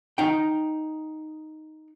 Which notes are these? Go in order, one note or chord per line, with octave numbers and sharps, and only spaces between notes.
D#4 G5